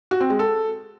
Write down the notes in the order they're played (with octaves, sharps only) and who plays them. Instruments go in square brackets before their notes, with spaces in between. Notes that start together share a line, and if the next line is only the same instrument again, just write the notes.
[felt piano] F#4
C4
G#3
A4